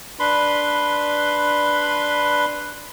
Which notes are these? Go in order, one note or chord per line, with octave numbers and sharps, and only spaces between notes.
D4 B4 B5 C6